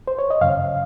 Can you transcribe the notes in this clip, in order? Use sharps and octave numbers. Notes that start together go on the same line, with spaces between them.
C5
C#5
D#5
F#2 C#3 F5